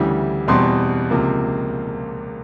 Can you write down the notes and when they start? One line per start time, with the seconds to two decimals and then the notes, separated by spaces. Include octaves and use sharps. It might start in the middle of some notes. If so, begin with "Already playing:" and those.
Already playing: D2 C#3 E3 G3
0.48 E2 B2 G3 C4 C6
1.10 C#2 C3 F3 A#3